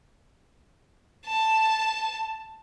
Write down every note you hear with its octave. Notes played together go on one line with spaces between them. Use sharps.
A5